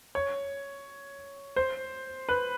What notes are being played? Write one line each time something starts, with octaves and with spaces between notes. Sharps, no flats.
C#5
C5
B4